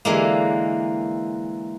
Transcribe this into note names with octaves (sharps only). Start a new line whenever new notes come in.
D3 E3 G#3 A#3